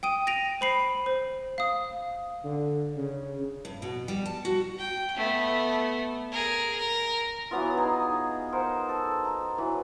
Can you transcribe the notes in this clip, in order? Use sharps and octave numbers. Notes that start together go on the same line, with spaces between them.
G5 D#6 D#7
A#6 D7 D#7 F7
C5 B5 C7
C5
F5 D#6
D3
C#3
G2
B2
G3
A5
F#4
G5
A3 B3
G#4 A#4
A#4
E3 F#3 B3 F4
D#4 G#4
A#4 C5 F#5
A4
A#5
E3 F#3